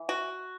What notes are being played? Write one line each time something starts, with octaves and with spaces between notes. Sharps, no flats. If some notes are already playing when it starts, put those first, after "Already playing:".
Already playing: E3
F#4